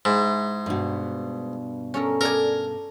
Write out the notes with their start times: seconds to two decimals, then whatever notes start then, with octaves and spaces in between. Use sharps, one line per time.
0.05 G#2 E4
0.66 G2 B2
1.94 C#4 A4 A#4
2.21 A4 A#4 D5 G#5